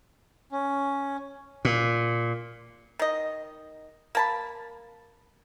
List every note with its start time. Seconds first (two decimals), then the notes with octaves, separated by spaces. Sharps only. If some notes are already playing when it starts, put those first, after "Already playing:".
0.52 C#4
1.65 A#2
2.99 D#3 D#5
4.15 A#3 A5 B5